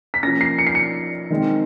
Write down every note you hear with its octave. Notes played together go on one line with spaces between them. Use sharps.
B6
F3 A#3 C#4 A#6
C7
C#7
C7
C#7
D#3 G#3 C4